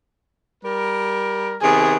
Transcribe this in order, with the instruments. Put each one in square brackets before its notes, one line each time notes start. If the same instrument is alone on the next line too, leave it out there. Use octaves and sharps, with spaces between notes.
[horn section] G3 A#4
[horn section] C3 D#3 B3 [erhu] G#4